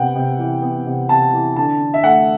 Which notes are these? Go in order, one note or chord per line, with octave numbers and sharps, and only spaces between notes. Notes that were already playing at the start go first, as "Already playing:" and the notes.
Already playing: C3 B3 F#5 G5
C3
E3
B3
C3
C3 A5
E3
D3 A5
D3
E5
A3 F#5